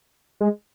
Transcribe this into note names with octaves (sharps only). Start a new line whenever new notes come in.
G#3